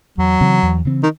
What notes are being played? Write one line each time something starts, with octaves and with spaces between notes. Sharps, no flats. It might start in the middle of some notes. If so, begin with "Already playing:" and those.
E2 F#3
C#3 E3 C4
E2
C#3 E3 C4
D#3